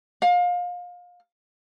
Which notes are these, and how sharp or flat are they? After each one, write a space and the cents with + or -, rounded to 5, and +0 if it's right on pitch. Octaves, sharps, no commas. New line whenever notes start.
F5 +30